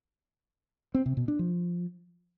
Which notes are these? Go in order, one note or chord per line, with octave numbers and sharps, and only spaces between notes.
C4
C3
B2
D4
F3